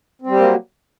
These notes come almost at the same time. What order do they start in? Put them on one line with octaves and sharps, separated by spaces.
C4 G3 G4 A#3 F#3